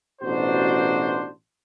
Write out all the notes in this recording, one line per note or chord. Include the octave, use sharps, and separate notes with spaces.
A1 B2 D4 D#4 F#4 C5